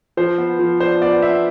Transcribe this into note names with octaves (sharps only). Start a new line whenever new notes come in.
F3 C5
B3
F3
D4 C5
B3 D5
B3 E5